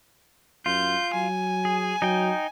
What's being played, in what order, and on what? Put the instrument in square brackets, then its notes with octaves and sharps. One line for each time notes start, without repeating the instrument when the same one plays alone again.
[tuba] F#2 [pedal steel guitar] F4 [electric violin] G6
[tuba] F#3 [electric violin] G#5
[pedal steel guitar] G#4
[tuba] F#3 [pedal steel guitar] D#4 G5